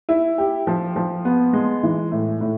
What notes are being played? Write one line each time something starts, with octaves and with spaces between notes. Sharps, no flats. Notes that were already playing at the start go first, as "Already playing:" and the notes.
E4
G4
F3
F3
B3
G#3
E3
A2
A2